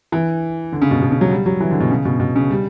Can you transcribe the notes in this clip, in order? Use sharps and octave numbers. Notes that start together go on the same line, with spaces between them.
E3
D3
C#3
B2
B2
C#3
F#3
G3
F#3
E3
D3
B2
C#3
B2
B2
C#3
G3